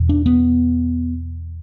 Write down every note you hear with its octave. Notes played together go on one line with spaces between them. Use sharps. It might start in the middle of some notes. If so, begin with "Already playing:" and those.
Already playing: E2 B2
D4
B3